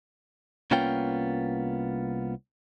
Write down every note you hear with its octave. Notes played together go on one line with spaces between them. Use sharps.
C2 A#3 B3 C#4 F4 G5